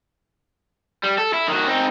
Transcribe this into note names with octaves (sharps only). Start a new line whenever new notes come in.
G3
A4
E4
D#3 F#4
C4 D#4